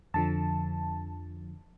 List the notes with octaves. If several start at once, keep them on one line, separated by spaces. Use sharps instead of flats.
F2 D3 F3 A5